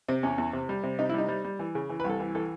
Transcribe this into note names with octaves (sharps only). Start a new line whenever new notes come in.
C3 C4
E2 C#4
E2
C3
G3
C3
C3 D#4
E4
G3 D#4
G3
G3
E3
C#3
E3
B4
C2
A4
E3
E3 A4